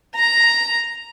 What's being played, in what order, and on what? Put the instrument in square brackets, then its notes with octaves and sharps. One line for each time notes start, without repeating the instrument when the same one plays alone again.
[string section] A#5